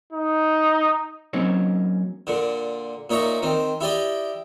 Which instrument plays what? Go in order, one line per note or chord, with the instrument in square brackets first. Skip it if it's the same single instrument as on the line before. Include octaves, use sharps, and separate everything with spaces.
[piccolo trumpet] D#4
[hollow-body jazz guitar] F#3 A#3 C4 C#4 D#4 C#5
[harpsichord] A#2 D3
A#2 D#4 C#5 E5 A#5
D#3 C4
E4 G4 D5 D#5